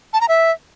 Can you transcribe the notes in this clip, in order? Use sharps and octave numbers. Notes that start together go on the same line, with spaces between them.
A5
A#5
E5